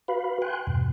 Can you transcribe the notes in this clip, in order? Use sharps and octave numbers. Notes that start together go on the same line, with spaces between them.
F#4 B4 F5 B5
G5 G#5 C6 F#6
E2 G2 B2